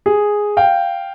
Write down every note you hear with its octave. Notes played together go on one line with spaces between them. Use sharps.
G#4
F5 G5